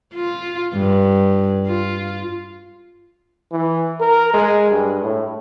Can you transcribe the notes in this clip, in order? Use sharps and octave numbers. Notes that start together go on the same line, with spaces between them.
F4
G2
F4
E3
A#4
G#3
G2
A2